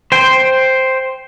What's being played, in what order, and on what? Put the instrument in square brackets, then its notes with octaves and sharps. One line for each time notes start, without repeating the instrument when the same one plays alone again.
[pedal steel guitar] C5 G5